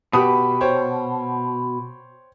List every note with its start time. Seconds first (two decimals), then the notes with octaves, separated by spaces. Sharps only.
0.13 B2 G4 B4 D#6
0.61 C5 C#5 G5